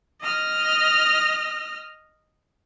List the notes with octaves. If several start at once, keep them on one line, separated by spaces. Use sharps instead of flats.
D#5 F6